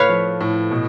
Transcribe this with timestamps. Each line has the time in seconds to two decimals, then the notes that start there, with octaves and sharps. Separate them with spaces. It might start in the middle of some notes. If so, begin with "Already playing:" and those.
Already playing: A2 A3 B4 C#5 F5
0.09 F3
0.41 A2
0.71 B2